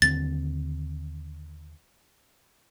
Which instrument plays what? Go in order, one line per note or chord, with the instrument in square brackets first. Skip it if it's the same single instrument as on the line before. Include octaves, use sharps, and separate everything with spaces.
[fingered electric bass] D#2 D3 C4 [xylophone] A6